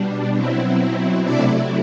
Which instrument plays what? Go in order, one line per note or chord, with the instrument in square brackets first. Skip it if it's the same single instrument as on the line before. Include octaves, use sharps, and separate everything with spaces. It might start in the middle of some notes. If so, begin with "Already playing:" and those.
Already playing: [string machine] B2 G3 D4
B2 F#3 C4 E4
C3 F#3 A3 D4 E4 D5